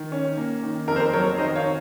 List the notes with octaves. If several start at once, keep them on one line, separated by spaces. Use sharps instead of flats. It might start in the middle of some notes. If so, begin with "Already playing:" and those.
Already playing: D#3
C#4
A#3
D#3
F2 A#4
C5
A#4
F#3 A#4 C#5
D#3 C5 D#5
C#5 F5